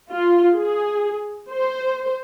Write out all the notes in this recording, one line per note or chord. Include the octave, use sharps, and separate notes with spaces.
F4
G#4
C5